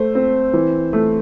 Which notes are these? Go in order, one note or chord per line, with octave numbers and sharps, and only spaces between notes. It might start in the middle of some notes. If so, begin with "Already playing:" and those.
Already playing: A3 C5
C4
E3
A3